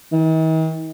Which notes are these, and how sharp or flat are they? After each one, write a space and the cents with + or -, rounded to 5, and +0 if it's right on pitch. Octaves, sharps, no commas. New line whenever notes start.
D#3 +45